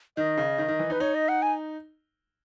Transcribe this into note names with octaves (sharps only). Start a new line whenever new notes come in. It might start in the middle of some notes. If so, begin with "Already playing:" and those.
D#3 D#5
C#3
D#3
D#3
E3
D#4 B4
D#4 C#5
D#5
F#5
G#5